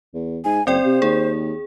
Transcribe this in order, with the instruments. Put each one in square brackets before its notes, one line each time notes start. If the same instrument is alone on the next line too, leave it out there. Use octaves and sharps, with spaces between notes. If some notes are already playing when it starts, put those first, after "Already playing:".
[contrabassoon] E2
[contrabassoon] G#2 [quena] G#5
[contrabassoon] F#1 [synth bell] C4 D5 G5 [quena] C5
[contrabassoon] C3
[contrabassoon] D#2 [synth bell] G#4